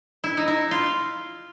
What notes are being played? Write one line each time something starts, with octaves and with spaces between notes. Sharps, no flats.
E4
D#4
E4
F4